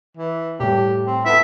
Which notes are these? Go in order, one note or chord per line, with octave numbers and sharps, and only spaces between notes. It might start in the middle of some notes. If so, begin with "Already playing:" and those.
E3
A2 G3 A3 G4
C4
B3 E4 A4 E5